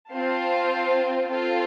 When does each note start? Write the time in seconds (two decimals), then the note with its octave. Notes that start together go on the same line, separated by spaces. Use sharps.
0.13 C4 F4 C5 F5 A5
1.29 C4 F4 A4